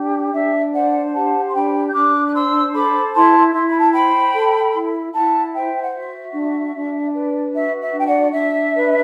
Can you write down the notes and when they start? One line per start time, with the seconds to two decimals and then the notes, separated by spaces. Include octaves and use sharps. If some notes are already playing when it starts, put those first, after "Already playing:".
Already playing: D4 G4
0.33 D4 E5
0.73 C5 D5 F#5
1.13 G4 F#5 A5
1.47 C6
1.53 D4 G5 B5
1.87 G6
1.94 D4 D6 F#6
2.26 F#6
2.34 C5 C6 E6
2.73 A4 B5 D6
3.14 E4 A5 C6
3.53 E4 C6
3.67 B5
3.79 A5
3.91 C5 G5 B5
4.34 A4
4.74 E4
5.13 E4 F#5 A5
5.54 C5 E5 G5
5.83 F#5
5.94 F#4 E5
6.33 D4
6.74 D4
7.13 B4
7.54 F#4 E5
7.80 E5
7.93 D4 G5
8.06 D5 F#5
8.33 D4 E5
8.74 B4